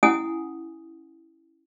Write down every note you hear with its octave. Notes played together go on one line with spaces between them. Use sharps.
C#4 E4 F#5 G#5 D#6